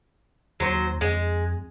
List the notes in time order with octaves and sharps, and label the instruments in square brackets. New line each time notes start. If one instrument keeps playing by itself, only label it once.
[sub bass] D#2 [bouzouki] F#3 C5
[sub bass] F2 [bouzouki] G#3